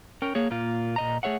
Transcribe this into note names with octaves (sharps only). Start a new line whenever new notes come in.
C#4 A#4 G5
A#3 G#4 C#5
A#2 A#3 F4
A#2 D#5 A#5
A3 G#4 C#5 E5 F#5